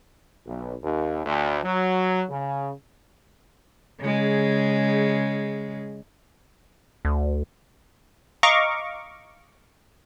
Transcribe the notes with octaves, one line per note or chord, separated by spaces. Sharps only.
B1
D#2
D2
F#3
C#3
C#3 G#3
D2
D#5 F5 A#5 C#6 D6